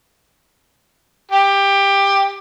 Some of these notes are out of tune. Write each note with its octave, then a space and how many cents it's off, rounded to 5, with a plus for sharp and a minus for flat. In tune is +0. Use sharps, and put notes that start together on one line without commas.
G4 +15